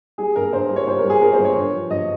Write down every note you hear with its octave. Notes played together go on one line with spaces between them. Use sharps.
G3 G#4
G2 A#4
G2 C5
G3
C#5
G3 C5
A#4
G3
G#4
G3 A#4
C5
G2
C#5
G2
F3
G2 D#5